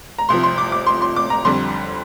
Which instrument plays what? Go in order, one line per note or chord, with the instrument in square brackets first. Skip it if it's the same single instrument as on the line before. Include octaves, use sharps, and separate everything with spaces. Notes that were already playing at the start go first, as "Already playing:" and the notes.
[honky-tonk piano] A#5
C2 C3 F3 C6
C6
D6
D6
C6
C6
D6
A#5
F2 D3 G3 C6